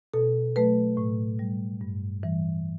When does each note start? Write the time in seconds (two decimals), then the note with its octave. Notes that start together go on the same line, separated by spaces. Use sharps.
0.14 B2 A4
0.56 F#3 A3 B4
0.97 A2
1.39 G3
1.81 G2
2.23 E3 G3